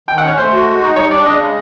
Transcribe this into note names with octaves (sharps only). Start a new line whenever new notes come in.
D#3 G5
F#5
C#4
C#5
A3 C5
F#4
G#3
D#4
G3 C#5
D4 D5
C#3 D#5
G#3